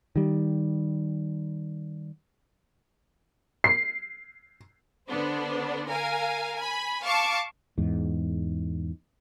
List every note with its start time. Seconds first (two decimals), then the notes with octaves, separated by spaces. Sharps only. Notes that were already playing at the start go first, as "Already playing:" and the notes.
0.16 D#3 G3
3.64 C7
5.09 D3 B3 D4 C5
5.89 A#4 F5 G#5
6.55 G#5 B5
7.04 F5 A5 C#6 D6
7.78 E2 G#2